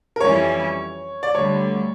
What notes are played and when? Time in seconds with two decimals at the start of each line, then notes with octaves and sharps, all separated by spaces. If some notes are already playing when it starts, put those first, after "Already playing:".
0.16 A#4
0.21 F2 E3 G3 C#4 E4 C#5
1.23 D5
1.34 D2 D3 G3 C#5